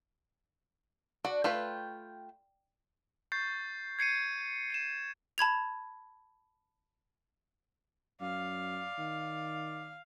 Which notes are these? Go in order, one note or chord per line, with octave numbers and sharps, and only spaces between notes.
D4 F#4
A3 F4 B4 G5
C#6 G6 A6 C7
G#6 C7 C#7 D#7
C#7 D#7 E7
A5 B5 G#6 F7
F#2 D5 F5
D#3